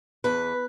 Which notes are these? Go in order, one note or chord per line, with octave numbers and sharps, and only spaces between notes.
E2 B4